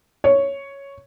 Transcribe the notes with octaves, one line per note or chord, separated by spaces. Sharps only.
C#5